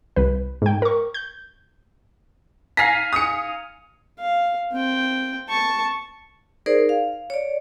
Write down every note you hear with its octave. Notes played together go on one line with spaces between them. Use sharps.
C2 B4
G#2 G5
A#4 C#6
G6
F5 G#5 A#5 B6 C7
D#6 C#7
F5
C4 G5
A5 C#6
D#4 G#4 A#4 C5 D5
F5
C#5 D5